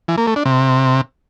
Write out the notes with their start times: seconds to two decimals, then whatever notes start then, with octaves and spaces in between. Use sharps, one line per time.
0.08 E3
0.18 A#3
0.27 A3
0.36 D4
0.45 C3